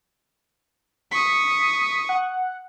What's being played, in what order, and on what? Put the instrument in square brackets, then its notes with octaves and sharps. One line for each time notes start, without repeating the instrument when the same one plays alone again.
[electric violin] C#6 D#6 [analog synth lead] B6
[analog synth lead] F#5